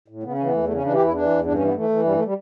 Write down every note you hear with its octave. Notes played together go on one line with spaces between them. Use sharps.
A2
C#3 B3
C#4
E3
B3
E2 A3
A3
C#3
C#4
E3 D4
G4
E2 E4
E3 D4
E2
G2 D4
C#4
E3
B3
E3 A3
E3
G2 G3
A3
G3